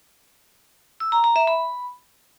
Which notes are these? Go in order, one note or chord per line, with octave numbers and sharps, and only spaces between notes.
E6
A#5
A#5
E5
B5